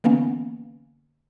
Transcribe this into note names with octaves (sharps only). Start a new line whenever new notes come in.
D3 E3 A#3 B3 C#4